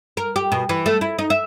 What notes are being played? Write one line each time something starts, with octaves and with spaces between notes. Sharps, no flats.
A#4
G4
B2
E3
A3
E4
D#4
E5